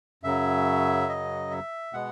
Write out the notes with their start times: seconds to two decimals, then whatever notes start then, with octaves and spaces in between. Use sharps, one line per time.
0.23 F#2 C#3 F#3 E5
1.09 D#5
1.51 E5
1.93 B2 G#3 B3 F#5